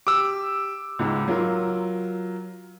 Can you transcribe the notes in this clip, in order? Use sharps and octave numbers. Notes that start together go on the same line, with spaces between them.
G4 D6 E6
C#2 G#2
F#3 F4 A#4